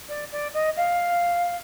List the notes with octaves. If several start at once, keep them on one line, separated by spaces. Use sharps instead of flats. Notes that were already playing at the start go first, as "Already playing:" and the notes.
D5
D5
D#5
F5